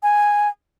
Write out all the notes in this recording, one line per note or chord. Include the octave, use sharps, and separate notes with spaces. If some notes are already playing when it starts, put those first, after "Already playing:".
G#5